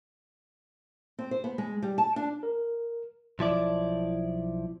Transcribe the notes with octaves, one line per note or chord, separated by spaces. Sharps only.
C4
C5
B3
G#3
G3
A5
D4
A#4
B1 F3 E4 D5